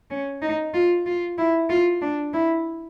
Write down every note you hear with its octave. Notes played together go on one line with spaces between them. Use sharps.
C#4
D#4
F4
F4
E4
F4
D4
E4